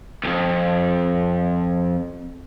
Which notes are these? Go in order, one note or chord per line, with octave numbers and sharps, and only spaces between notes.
C2 F2